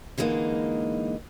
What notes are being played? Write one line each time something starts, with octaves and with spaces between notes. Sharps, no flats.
D3 E3 G#3 A#3 D#4